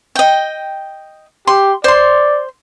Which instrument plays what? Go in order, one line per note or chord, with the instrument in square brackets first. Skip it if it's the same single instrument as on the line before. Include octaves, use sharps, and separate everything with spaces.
[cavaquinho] D#5 G5
[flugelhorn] G4 [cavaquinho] C6
[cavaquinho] C5 C6 [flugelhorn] D5